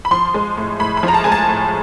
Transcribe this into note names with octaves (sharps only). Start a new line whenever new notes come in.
B5
F3 C6
G#3
A2
A2 B5
B5
F3
A#5
A5
G#3 G#5
A5
A2